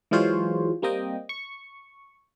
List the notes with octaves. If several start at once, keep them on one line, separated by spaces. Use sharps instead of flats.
E3 F#3 G#3 F4 C5 C#5
G3 A#3 C4 D#5 G5
C#6